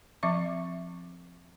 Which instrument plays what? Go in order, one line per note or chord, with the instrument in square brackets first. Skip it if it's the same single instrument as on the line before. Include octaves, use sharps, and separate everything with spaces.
[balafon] F3 C4 E5 C#6